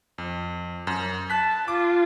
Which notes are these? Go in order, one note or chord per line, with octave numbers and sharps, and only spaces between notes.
F2
F#2
A5 F#6 B6
F4 D6